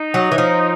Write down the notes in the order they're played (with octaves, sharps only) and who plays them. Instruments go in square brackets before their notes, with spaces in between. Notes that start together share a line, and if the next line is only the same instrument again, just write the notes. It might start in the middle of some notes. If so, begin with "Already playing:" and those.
Already playing: [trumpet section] D#4
[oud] F#3
E3
F3